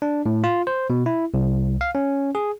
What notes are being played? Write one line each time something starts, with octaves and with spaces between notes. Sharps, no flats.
D4
A2
F4
C5
B2
E4
C2
F5
C#4
G#4